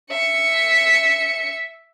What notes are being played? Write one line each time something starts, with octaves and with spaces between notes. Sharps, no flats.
E5 C#7